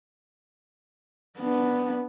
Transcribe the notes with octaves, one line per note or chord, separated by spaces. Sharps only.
B3 D4